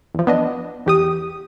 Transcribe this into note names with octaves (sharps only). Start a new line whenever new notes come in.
E2 F3
B3 D4 D#5
E2 G4 D#6